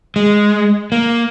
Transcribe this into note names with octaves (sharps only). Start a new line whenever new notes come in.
G#3
A#3